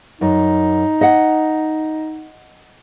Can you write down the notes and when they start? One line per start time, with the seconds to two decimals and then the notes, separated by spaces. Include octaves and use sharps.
0.21 F#2 D#4
1.01 D#5 F#5